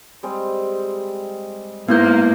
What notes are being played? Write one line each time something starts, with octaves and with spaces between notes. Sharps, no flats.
G3 G#3 C4
G#2 A#3 B3 E4 F4 D#5 F#5 G6